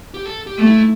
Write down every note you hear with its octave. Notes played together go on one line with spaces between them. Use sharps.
G4
A4
G4
A3
E4